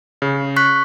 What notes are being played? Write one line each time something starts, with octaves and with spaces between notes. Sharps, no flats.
C#3
C#6 F#6 B6